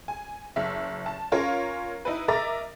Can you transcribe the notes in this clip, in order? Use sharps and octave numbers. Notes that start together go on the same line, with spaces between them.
G#5
F#1 E5
A5
C#4 F4 A#4 C#5 F5
D#4 E4 B4
A#4 D#5 E5 A#5 D6 A6